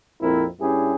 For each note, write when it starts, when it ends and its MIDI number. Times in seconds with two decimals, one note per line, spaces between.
0.21 0.45 34
0.21 0.45 41
0.21 0.45 60
0.21 0.45 64
0.21 0.45 70
0.61 0.96 43
0.61 0.96 61
0.61 0.96 64
0.61 0.96 67
0.61 0.96 68